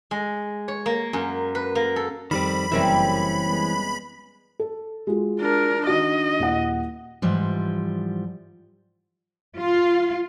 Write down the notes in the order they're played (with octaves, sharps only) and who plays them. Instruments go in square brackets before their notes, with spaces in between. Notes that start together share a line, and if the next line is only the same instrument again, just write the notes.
[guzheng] G#3
C#5
A#3
F#2
B4
A#3
A4
[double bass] F2 [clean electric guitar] D#3 G3 C4 [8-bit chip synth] B5
[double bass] F#1 [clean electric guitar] E3 C4 C#4 [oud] G3 A#4 E5
[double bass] G#3 B3
[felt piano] A4
G#3 F4 F#4
[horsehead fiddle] D4 A#4
[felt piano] D#3 D4 F#4 [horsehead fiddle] D#5
[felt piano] D#1 E4 F#5
[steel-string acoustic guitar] G#2 E3 F3 G3
[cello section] F4